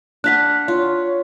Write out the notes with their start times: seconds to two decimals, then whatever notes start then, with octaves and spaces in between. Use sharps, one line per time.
0.24 D4 F5 F#5 F#6 B6
0.68 F4 C#5